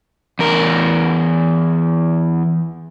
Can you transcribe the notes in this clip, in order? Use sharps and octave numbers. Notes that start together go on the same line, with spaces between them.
E2 A#4